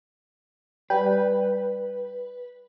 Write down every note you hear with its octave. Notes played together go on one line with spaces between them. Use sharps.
G3 B4